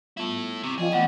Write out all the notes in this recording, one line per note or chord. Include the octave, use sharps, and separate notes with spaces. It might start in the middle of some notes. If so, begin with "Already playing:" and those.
G3 B3 E4 F4 A4
C3 C#6
F3 G#4 D5 D#5 G5
E2 A3 B3 C#4 F#5